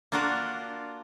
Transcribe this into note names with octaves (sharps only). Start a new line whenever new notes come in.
A#3 D4 F4 F#4 A#4 D5